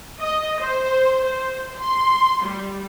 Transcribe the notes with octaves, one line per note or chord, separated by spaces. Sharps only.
D#5
C5
C5
C6
G3